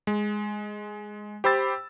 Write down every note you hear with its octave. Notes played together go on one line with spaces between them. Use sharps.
G#3
G4 C5 B5 E6 A6